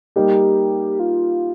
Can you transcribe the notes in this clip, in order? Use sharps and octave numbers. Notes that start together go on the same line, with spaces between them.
G3 A#3 D#4 G4
F4